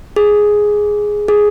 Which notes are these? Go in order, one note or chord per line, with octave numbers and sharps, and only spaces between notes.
G#4
G#4